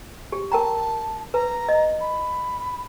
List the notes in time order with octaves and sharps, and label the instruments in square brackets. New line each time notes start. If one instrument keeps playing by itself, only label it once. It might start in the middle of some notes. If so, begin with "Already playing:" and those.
[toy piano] G4
[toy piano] A#4 G5 A#5 [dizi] A5
[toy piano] B4 [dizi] A#5
[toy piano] D#5
[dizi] B5